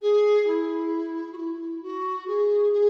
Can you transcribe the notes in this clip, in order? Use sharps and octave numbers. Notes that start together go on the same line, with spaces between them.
G#4
E4
F#4
E4
F#4
G#4
G#4